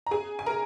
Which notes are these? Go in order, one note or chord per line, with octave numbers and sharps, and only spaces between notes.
A#5
G#4 G#5
G#5
A#4 A#5